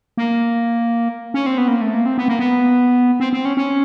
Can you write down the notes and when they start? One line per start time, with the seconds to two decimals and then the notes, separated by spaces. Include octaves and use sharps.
0.17 A#3
1.34 C#4
1.46 C4
1.58 B3
1.68 A#3
1.81 A3
1.94 A#3
2.06 C4
2.18 B3
2.28 A#3
2.39 B3
3.20 C4
3.33 C4
3.45 C#4
3.57 C#4